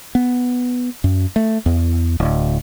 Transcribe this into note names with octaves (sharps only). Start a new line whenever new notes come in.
B3
F#2
A3
E2
D1